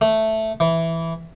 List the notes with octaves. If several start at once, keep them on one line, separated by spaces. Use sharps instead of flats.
A3
E3